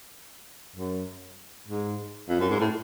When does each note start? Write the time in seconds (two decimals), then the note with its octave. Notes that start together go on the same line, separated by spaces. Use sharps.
0.76 F#2
1.68 G#2
2.29 F2
2.39 F#2
2.50 G#2
2.60 A2